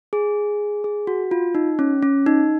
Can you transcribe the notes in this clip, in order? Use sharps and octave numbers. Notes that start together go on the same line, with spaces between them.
G#4
G#4
F#4
F4
D#4
C#4
C#4
D#4